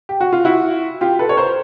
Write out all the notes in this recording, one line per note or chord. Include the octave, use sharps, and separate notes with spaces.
G4
F#4
F4
E4 F#4
F4 G4
A4 B4
C#5
A#4 C5